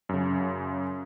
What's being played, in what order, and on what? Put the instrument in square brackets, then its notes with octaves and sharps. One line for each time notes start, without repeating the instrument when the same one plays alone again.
[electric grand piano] F#2 C#3